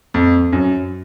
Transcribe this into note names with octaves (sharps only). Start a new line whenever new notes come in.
F2
F#2